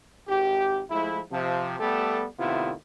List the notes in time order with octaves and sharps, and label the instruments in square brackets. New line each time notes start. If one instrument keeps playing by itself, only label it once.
[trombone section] G#1 G4
F3 G#3 A3 E4
C3 F3
G3 A3 B3 G4 A4
A2 C3 D#3 B3 E4 F4